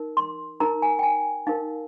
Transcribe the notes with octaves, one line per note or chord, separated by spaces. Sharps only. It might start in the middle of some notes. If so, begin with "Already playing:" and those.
Already playing: D#4 A#4
C6
D#4 A#4 A#5
G#5
G5
G#5
D#4 A#4 F5